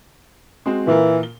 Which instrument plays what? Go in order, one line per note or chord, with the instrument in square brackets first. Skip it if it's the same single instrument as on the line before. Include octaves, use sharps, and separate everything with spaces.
[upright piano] G#3 C4 F#4
[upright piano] A#2 F4 A#4 [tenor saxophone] E3
[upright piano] G7